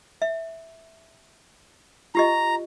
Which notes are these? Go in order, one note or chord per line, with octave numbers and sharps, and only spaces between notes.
E5
F4 G4 D#5 A#5